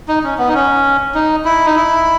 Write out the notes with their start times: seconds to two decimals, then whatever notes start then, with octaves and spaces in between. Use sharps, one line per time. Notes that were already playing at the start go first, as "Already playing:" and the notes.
0.08 D#4
0.24 C#4
0.38 B3
0.48 D#4
0.54 C#4
1.15 D#4
1.45 E4
1.66 D#4
1.76 E4